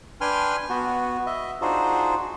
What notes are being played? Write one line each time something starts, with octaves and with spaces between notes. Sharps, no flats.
D4 B4 G5 G#5 C6 F6
B3 F#4
D#5 E5
D4 D#4 F4 F#4 G#4 C5